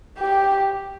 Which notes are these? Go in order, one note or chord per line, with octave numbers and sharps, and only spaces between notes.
G4